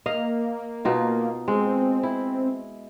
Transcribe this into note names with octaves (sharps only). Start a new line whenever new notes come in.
A#3 D#5 F5
B2 D#4 F4
G#3 C4
E4